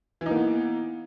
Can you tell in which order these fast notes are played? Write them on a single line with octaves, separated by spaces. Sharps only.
E3 D#4 A#3 B3